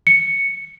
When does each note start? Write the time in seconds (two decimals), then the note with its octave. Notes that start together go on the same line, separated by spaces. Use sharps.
0.07 C#7